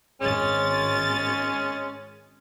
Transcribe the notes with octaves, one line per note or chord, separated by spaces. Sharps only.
G#1 G#3 C#4 A6